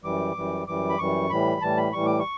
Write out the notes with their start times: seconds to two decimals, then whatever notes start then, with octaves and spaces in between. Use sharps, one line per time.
0.04 F#2 E3 G3 D6
0.35 F#2 E3 G3
0.67 F#2 E3 G3 D6
0.90 B5
0.98 F#2 E3 G3 C#6
1.30 A2 E3 G3 B5
1.61 A2 E3 G3 A5
1.77 B5
1.93 A2 E3 G3 C#6
2.06 D6
2.19 C#6